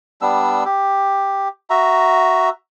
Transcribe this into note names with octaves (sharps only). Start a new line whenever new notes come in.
G3 B3 D4 E6
G4
F#4 E5 A#5